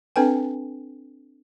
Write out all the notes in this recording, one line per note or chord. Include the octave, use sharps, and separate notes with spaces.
C4 D4 A4 B4 G5 G#5